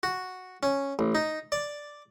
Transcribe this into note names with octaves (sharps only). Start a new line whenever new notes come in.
F#4
C#4
A1
D#4
D5